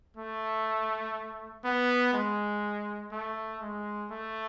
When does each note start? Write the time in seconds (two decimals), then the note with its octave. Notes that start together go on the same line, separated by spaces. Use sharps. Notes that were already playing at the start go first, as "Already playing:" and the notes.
0.17 A3
1.64 B3
2.13 G#3
3.12 A3
3.61 G#3
4.11 A3